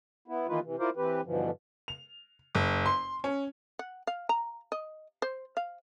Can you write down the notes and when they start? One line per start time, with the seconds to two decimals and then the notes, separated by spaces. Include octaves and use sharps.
0.28 B3 E4
0.48 D#3 E3 A#3 D#4 F4 B4
0.64 C3 E3
0.79 E4 F4 A#4 C5 D5
0.97 E3 C4 G4 B4
1.25 G2 B2 D3 E3 F3
1.88 F7
2.55 F#1
2.86 C6
3.24 C#4
3.79 F#5
4.07 F5
4.29 A#5
4.72 D#5
5.22 C5
5.57 F5